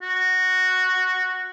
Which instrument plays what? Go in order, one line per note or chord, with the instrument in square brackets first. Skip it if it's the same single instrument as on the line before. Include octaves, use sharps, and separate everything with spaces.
[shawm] F#4